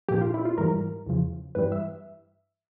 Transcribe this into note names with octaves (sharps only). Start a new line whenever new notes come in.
A#2 F3 G4
F4
E4
F4
G#2 E3 G3 A#4
E2 C#3 F3
G2 E3 G3 B4
E5